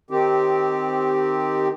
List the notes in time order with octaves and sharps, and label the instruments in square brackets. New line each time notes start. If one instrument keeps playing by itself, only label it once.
[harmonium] D#3 C4 G4